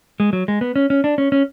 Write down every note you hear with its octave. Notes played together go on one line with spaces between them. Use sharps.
G#3
F#3
G#3
B3
C#4
C#4
D4
C#4
C#4